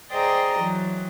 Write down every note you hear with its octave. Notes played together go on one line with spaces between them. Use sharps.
G#4 C5 D5 D#5 G5 A#5
E3 F#3